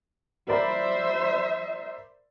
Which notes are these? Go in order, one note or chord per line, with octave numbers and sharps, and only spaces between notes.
A#4 C5 D5 E5 B5